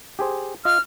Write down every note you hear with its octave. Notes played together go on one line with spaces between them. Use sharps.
G4 G#4 C5
F4 D#5 F6